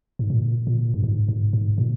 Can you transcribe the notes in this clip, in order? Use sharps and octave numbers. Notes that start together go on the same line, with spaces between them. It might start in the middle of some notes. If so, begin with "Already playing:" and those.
G#2
A#2
A#2
G2
G#2
G#2
G#2
A#2